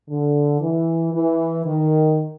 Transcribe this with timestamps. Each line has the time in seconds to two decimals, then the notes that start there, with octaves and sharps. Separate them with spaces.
0.09 D3
0.61 E3
1.14 E3
1.66 D#3